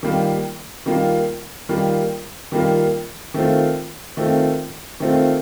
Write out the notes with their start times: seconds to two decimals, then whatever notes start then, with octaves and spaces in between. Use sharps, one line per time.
0.03 D#3 G3 A#3 F4
0.86 D#3 G3 A#3 F4
1.69 D#3 G3 A#3 F4
2.52 D#3 G3 A#3 F4
3.34 D#3 A3 C4 F4
4.17 D#3 A3 C4 F4
5.00 D#3 A3 C4 F4